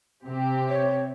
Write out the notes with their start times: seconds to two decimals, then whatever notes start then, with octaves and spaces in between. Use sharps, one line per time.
0.25 C3 C4 G4
0.69 C#5